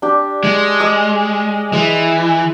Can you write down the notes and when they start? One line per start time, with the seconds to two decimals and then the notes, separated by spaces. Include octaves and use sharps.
0.02 D4 G4
0.44 G#3
0.80 D#5 D6 E6
1.73 E3 G#3